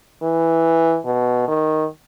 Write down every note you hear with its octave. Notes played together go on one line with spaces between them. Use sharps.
E3
B2
D#3